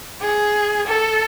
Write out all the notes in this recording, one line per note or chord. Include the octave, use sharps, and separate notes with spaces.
G#4
A4